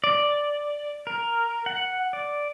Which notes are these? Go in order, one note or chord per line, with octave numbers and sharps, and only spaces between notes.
D5
A#4
F#5
D5